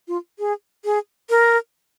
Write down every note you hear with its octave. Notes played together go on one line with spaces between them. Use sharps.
F4
G#4
G#4
A#4